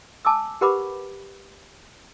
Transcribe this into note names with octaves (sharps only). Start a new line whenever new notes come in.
G#5 A5 D6 E6
G4 A#4 B4 F#5 B5 D6